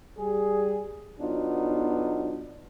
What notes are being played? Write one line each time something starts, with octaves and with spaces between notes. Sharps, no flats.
G3 G#4
B1 F#3 B3 D4 D#4 F4